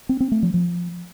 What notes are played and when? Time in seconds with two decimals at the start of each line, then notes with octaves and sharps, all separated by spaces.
0.09 C4
0.20 C4
0.32 A3
0.43 F3
0.54 F3